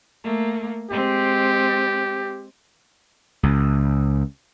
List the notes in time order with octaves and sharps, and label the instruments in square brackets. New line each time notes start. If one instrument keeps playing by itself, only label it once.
[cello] A3 A#3
[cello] G#3 C4 [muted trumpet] G4
[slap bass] C#2